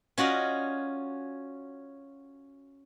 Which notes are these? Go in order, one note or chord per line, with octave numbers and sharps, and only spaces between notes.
C#4 F4 F#4 D5 D#5